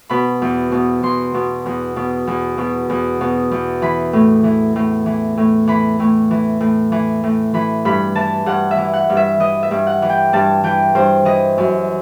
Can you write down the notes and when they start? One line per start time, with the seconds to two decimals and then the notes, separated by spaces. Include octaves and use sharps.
0.09 B2 B5
0.42 E2
0.72 B2
1.03 E2 C6
1.34 B2
1.66 E2
1.96 B2
2.27 E2
2.58 B2
2.90 E2
3.21 B2
3.51 E2
3.82 E3 B5
4.13 A2
4.44 E3
4.76 A2
5.06 E3
5.37 A2
5.67 E3 B5
6.00 A2
6.31 E3
6.60 A2
6.92 E3
7.24 A2
7.54 E3 B5
7.85 G2 B5
8.15 E3 A5
8.46 G2 F#5
8.71 E5
8.78 E3
8.93 F#5
9.09 G2
9.17 E5
9.40 E3 D#5
9.63 E5
9.71 G2
9.87 F#5
10.02 E3
10.09 G5
10.33 G2 A5
10.64 E3 G5
10.95 G2 C5
11.25 E3 D#5
11.58 F#2